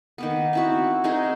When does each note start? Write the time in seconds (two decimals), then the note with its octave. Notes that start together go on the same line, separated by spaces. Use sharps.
0.18 D#3 A#3 B3
0.53 C4 E4 F#4
1.04 C4 D#4 G#4 A#4